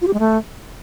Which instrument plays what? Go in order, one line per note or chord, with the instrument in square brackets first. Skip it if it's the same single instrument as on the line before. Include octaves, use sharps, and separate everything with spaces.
[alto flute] F4
G4
G#3
A3